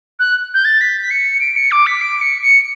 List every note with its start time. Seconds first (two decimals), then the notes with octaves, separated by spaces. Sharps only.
0.19 F#6
0.54 G6
0.65 A6
0.81 B6
1.01 B6
1.11 C#7
1.40 D7
1.56 C#7
1.71 D6
1.87 B6
2.01 D7
2.21 C#7
2.42 C#7